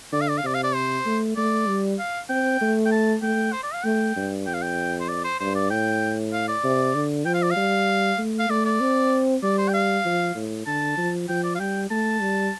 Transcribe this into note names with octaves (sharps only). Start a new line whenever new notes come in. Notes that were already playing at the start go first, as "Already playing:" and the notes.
D3 D5
F5
D5
F5
C3 D5
F5
D5
C5
A3
A3 D5
G3
F5
C4 G5
A3
G5
A5
A3 G5
C5
D5
F5
A3 G5
G2
F2 G5
F5
G5
C5
D5
C5
G2 C5
D5
A2 G5
F5
D5
C3
D3
F3 G5
F5
D5
F5
G3
A3
F5
A3 D5
D5
C4
G3 D5
C5
G5
F5
F3
A2
D3 A5
F3
F3 G5
D5
F5
G3 G5
A3 A5
G3